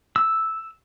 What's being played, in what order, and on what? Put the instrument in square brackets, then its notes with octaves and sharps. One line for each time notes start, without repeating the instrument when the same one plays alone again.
[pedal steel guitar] E6